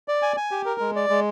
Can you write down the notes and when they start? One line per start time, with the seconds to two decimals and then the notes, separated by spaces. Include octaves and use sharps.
0.08 D5
0.22 G#5
0.37 G#5
0.51 G4
0.66 A#4
0.80 G#3
0.96 D5
1.10 G#3